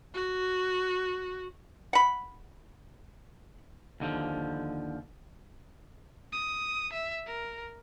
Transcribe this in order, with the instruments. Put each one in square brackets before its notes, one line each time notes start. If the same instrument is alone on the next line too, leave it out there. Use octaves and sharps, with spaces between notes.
[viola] F#4
[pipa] F#5 B5
[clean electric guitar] D#2 D3 F3
[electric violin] D#6
E5
A#4